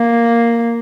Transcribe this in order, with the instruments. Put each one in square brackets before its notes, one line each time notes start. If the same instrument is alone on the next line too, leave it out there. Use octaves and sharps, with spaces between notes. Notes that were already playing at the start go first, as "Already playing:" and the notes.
Already playing: [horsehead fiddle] A#3